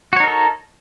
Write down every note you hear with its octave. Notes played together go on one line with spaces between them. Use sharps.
D#4 F#4 A4 A#4 C#5